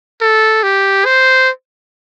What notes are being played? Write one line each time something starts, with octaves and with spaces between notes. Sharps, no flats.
A4
G4
C5